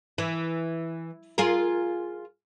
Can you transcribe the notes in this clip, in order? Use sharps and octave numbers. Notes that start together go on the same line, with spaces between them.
E3
F4 G#4 A#4